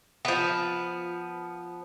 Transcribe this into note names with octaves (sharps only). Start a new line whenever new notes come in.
F3 B3